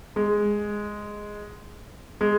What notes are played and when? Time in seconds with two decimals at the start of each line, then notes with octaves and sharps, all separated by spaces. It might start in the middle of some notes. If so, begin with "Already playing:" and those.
0.16 G#3
2.21 G#3